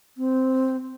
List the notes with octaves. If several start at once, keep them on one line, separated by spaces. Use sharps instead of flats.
C4